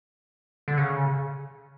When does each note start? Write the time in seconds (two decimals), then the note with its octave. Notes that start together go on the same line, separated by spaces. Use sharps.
0.68 D3
0.78 C#3